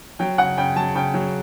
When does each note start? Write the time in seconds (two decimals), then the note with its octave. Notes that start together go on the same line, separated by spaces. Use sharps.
0.19 F#3 G5
0.38 C#3 F#5
0.58 C#3 G5
0.76 F#3 A5
0.95 C#3 G5
1.14 F#3